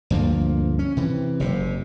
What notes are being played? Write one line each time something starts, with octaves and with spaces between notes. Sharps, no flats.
D2 G2 F3 A#3
C#4
C3 E3
F#1 C3